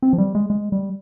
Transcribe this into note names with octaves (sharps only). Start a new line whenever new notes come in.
C4
F3
G3
G#3
G#3
G3